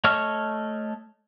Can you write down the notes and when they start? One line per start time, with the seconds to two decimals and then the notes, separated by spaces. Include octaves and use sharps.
0.04 A3 C#5 D#5 C#6 F6